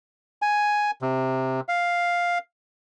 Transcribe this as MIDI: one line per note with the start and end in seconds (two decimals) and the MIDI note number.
0.42 0.91 80
1.02 1.60 48
1.69 2.38 77